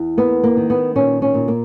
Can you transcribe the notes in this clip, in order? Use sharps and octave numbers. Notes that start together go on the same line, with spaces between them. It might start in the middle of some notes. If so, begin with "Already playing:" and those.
Already playing: E2
A#3 B3
A#3
D#3
B3
A#2 C#4
C#4
A#2
A#3